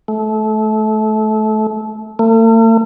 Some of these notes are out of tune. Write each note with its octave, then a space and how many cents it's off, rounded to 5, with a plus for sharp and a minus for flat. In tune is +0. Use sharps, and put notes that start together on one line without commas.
A3 -25
A3 +45